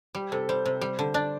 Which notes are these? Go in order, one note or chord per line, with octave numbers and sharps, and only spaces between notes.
G3 G4
C3 A4
G3 C5
C3
G3
D3
D4 D5